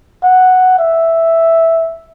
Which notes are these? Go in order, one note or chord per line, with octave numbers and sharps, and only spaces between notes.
F#5
E5